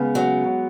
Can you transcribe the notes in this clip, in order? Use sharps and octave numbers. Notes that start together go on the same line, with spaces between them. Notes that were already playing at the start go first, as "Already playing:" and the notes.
Already playing: C#3 G#3 B3
F#3